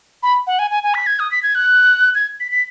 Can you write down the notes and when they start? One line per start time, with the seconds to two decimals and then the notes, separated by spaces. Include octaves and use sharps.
0.23 B5
0.47 F#5
0.59 G#5
0.71 G#5
0.83 G#5
0.94 B6
1.07 G#6
1.20 D#6
1.31 B6
1.43 G#6
1.55 F#6
2.15 G#6
2.40 B6
2.52 B6